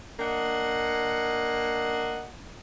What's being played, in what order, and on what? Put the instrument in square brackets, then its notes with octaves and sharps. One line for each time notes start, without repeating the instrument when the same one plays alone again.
[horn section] A#3 D4 D#5 F#5